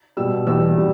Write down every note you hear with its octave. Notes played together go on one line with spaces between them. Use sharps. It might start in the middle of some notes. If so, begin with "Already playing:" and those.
B2 G3 E6
E2 B2 G3 E6
B2 G3